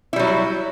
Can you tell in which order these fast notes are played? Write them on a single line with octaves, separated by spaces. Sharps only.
E4 G3 F#3